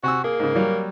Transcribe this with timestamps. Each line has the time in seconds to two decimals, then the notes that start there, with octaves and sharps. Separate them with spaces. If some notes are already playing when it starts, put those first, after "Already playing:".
0.03 C3 F#4 G#5 E6
0.24 A#3 G#4
0.39 G#2 C#3
0.55 F#3 G3